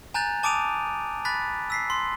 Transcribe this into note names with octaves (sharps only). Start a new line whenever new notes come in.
G#5 A#5 F#6 G6 A6 F7
A5 D6 D#6 D7 D#7 F7
B5 F#6 A6 B6
E6 B6 C7
C6